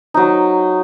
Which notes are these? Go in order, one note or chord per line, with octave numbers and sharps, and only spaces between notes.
F#3 D#4